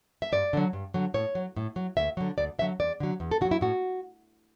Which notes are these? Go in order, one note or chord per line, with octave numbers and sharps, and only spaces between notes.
E5
G2 D5
D3 F#3
G2
D3 F#3
A2 C#5
F#3
A2
F#3
D2 E5
D3 F#3
D2 D5
D3 F#3 E5
E2 D5
D3 F#3
E2
A4
D3 F#4
F#3
E4
A2 F#4